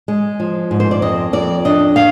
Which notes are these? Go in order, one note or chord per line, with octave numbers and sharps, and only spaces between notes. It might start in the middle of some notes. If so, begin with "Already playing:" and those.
G#3
F3
G#2
C5
D5
F2 D#5
F2 D5
D4 D#5
F5